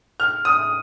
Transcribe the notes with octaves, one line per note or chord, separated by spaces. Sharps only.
F6
D#6